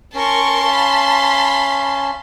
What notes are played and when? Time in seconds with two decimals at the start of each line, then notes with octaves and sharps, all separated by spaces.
0.15 C#4 A#4 A5 C6 C#6
0.69 F5 B5